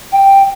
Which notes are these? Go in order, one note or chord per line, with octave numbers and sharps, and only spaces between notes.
G5